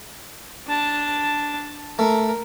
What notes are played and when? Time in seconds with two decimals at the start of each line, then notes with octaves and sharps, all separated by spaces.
0.68 D4 A5
1.99 A3 A#4